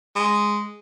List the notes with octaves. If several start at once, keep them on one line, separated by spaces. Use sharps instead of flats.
G#3